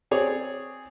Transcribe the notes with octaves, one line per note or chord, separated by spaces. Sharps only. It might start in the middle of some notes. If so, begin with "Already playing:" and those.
C4 G#4 C#5 D5